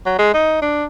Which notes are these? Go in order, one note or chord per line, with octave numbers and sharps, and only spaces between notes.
F#3
G#3
D#4
D4